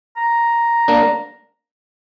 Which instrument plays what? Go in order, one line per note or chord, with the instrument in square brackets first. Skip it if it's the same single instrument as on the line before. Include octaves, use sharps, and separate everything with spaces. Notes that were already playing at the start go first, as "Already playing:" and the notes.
[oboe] A#5
[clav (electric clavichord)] A#3 D4